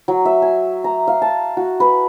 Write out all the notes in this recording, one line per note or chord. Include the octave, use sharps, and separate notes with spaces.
F#3
E5
G#5
A#5
F5
A5
F#4
B4